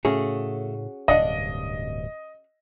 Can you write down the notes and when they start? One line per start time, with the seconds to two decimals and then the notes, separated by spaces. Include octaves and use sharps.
0.05 A2 C#3 A3 C#4 F#4 G#4
1.08 D1 G2 C3 D4 D#5 F5 F#5